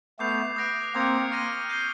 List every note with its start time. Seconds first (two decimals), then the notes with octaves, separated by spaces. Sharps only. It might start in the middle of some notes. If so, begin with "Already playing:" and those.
0.19 A3 B3 D6 G6 C7 F7
0.56 D#6 F#6 A#6 D7
0.94 A#3 C4 D#6 G#6 C#7
1.31 C#6 F6 A#6 D#7
1.70 G6 C7 D#7 G7